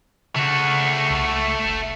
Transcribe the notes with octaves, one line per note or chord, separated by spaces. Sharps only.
C#3 A3 F#4
C2
F1